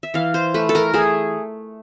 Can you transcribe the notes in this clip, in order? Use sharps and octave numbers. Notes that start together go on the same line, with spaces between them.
E5
E3 F5
C5
A3 B4
A4
A#4
A3 G#4